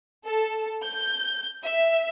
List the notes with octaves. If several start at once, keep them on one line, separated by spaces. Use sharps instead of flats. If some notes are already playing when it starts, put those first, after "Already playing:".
A4
G6
E5